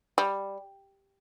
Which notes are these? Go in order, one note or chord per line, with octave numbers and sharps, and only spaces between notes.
G3